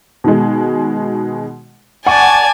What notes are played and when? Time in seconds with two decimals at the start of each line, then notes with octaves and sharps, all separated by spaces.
0.24 B2 D#3 G#3
2.07 D5 F#5 G#5 A5 C#6 D#7